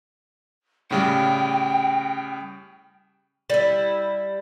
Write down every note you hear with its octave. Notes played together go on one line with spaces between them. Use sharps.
A2 C#3 G3 G5
G3 E4